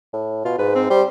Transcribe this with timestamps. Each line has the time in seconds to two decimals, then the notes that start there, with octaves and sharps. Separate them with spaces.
0.14 A2
0.45 B2 F4
0.58 G#2 B4
0.75 C4
0.90 G3 C5